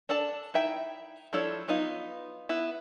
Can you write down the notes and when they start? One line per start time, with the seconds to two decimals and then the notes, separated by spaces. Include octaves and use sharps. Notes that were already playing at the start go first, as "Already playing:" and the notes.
0.09 D4 A4 D5 A5
0.54 D#4 E4 E5 G5
1.33 F3 D4 E4 A4 C#5
1.68 F#3 B3 D#4 F4
2.49 B3 E4